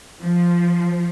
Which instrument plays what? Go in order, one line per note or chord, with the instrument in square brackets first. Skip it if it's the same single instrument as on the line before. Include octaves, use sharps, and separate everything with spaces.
[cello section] F3